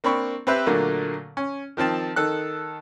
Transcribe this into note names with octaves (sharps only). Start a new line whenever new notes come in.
A#3 C4 D4 B5 C#6
C4 G4 B4 C5 E5
A#2 D3 F#3 A3 A#3
C#4
D#3 F3 C4 A5
D#3 A4 F#6